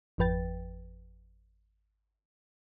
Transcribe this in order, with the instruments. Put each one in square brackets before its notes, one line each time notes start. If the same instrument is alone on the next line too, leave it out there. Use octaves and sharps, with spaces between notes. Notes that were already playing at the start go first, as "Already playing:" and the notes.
[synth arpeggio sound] G#1 F2 F3 B4 G5 A6